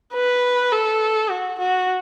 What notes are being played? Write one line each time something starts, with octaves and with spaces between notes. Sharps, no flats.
B4
A4
F#4
F#4